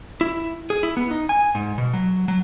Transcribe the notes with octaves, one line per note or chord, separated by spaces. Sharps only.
E4
G#4
E4
B3
D#4
G#5
G#2
B2
F#3
F#3